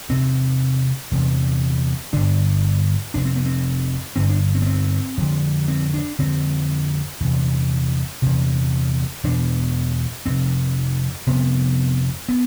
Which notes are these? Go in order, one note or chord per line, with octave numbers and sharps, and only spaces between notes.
E2 C3 C4
E2 C3
G2 D3 D4
F2 C3 D4
C4
B3
C4
G2 D3 C4
D4
C4
B3
C4
F2 D3
C4
D4
F2 D3 C4
E2 C3
E2 C3
E2 B2 D4
F2 C3 C4
F2 C3 B3
B3